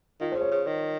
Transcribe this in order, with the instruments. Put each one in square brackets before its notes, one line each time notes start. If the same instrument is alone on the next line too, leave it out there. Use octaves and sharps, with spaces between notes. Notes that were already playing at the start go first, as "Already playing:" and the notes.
[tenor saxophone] D#3 [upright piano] F4
[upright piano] C5
[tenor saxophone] C#3
[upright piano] C#5
[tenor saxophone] C#3
D#3